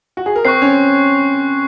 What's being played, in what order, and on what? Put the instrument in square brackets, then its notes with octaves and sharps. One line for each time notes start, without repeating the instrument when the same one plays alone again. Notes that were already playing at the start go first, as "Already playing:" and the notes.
[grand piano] F#4
G#4
A#4
[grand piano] C4 C5 [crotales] C#6 F#6 C7
[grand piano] C#4 C#5